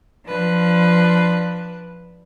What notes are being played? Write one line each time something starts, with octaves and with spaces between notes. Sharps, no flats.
F3 D4 B4